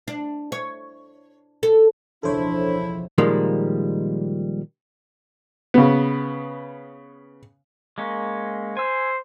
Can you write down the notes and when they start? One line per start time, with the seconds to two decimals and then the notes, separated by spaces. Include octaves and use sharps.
0.08 D4
0.52 C#5
1.63 A4
2.23 E1 C#2 F3 D4 E4 A4 C5 C#5
3.18 A#2 D#3 F3 G3 G#3 A#3
5.74 C#3 B3
7.98 G#3 A#3 C#4
8.77 C5 G#5 E6